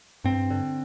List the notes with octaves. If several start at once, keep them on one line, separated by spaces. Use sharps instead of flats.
G2 C4
D3